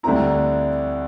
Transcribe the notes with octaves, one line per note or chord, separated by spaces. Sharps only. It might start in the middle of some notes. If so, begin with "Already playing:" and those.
D2 D3 G3 C4 E4 A#5